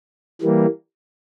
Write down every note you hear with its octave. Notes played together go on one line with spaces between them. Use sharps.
E3 G3 A#3